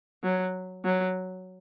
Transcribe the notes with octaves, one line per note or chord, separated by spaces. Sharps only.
F#3
F#3